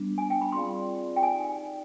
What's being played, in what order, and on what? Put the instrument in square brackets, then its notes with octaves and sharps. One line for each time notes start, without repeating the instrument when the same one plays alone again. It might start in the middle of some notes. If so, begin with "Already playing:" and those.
Already playing: [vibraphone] G3 B3 D4
[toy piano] G#5
G5
B5
[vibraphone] C4 F4 G#4 D5 F5 [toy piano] C6
[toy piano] G5
[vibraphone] D#4 G4 D5 F5 [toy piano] G#5